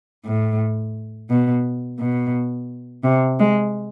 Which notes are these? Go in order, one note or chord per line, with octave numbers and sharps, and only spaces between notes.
A2
B2
B2
C3
G#3